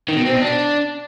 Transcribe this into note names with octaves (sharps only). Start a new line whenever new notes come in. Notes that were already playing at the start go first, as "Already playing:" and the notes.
D#3
B2
C4
B2
D4